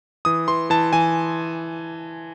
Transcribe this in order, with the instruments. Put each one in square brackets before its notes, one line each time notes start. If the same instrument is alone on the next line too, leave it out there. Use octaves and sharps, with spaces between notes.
[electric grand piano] E3 D#6
E3 C6
E3 A5
E3 G#5